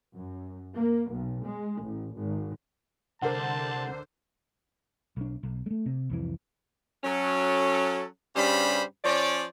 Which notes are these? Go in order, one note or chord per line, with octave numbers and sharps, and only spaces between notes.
F#2
A#3
B1
G#3
A1
G#1
C2 D3 A#4 C5 F#5 A5
B1 D4
B1
G#3 A3
C3
C2 F2 E3
F#3 C#4 A4
G2 C#3 G3 C#4 C5 B5
F3 C#4 C#5 D5